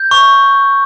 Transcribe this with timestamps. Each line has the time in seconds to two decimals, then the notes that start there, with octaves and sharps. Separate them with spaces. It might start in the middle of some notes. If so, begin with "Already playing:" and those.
Already playing: G6
0.11 C#6